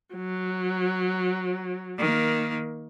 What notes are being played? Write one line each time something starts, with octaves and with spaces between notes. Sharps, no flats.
F#3
D#3 A#3